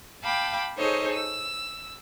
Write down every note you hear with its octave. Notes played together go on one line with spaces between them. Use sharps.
F5 G5 A5 B5 D6
D#4 G#4 A4 C5 C#5 D#5
E6